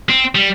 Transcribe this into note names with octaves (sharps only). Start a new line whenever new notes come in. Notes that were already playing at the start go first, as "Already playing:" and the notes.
C4
G3